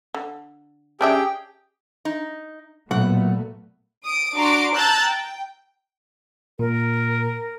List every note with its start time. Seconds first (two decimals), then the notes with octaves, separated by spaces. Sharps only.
0.15 D3
1.01 C#4 D4 G4 G#4 E5 G5
2.05 D#4
2.91 B1 A#2 A3 B3 F#5
4.04 D#6 D7
4.37 D4 F#4 A#5 C6 D6 D7
4.75 A5 A#5 E6 F#6 G6 A6
5.07 G5
6.59 A#2 A#4